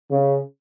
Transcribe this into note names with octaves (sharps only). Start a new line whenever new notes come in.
C#3